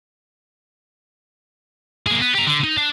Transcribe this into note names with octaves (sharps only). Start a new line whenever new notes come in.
A#3 G#4
B3
G4 A#5
D3
D#4
D4